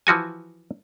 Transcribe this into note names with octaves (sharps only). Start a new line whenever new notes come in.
E3 F3 F#4 G#5